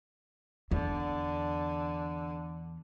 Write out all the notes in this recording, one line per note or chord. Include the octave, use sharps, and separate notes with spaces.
E2 D3